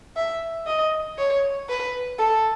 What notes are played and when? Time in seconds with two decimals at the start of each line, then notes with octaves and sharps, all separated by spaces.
0.16 E5
0.66 D#5
1.18 C#5
1.69 B4
2.19 A4